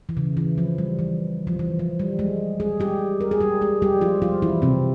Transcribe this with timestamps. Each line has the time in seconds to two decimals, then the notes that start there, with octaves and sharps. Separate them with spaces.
0.09 E3
0.17 C#3
0.37 E3
0.58 F3
0.78 G3
0.99 E3
1.47 F3
1.59 E3
1.79 F3
2.00 G3
2.19 G#3
2.60 G#3 G#4
2.80 G3 G4
3.21 A#4
3.31 G#4
3.40 G3 G4
3.61 G#3 G#4
3.82 G3 G4
4.01 F3 F4
4.22 F3 F4
4.42 E3 E4
4.62 C3 C4